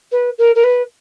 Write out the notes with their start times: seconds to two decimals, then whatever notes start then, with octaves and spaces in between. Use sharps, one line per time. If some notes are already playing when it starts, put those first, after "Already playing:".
0.11 B4
0.38 A#4
0.55 A#4
0.63 B4